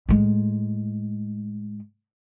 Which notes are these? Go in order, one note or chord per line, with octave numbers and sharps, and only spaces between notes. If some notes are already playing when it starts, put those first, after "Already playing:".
A2 G#3